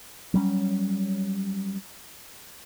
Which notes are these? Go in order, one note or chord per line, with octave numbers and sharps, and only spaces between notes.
F#3 G3 C#4